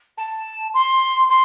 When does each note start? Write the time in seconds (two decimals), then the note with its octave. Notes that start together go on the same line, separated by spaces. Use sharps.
0.17 A5
0.74 C6
1.29 C6